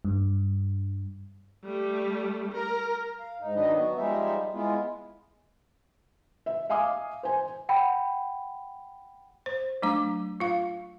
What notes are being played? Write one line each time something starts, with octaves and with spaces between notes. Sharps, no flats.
G2
G3 A3
A#4
F5
G#2 D#4
D#3 F#3 D4 D#4 B4 D#5
B3 F#4
F3 G3 G#3 D#4 E5
G#3 B3 E4 F4
E5
E5 F5 G#5 D6 D#6
C5 G#5
F#5 G5 B5
C5
F#3 A3 D4 D6
F4 F5